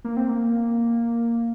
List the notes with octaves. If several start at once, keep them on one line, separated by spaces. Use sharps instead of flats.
A#3
C4
A#3